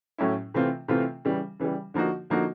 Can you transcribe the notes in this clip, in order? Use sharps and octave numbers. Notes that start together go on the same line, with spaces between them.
A2 F#3 A3 C#4 E4
C3 E3 A3 C4 F4
C3 E3 A3 C4 F4
C#3 E3 G3
C#3 E3 G3
D3 F3 A#3 D#4 F#4
D3 F3 A#3 D#4 F#4